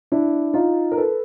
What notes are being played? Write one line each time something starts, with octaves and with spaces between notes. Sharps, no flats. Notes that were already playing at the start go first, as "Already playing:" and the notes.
D4 E4
D#4 F4
A#4
A4 B4